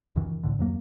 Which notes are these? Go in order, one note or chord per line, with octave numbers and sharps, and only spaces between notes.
C#2 F#2 D#3 E3
C2 A2 D3
F2 F#3 A#3